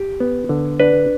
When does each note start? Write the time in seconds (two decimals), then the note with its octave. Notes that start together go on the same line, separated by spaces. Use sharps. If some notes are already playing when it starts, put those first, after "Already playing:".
Already playing: G4
0.20 B3
0.49 D3
0.80 D4 B4